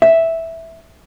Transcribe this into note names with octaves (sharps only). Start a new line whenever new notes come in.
E5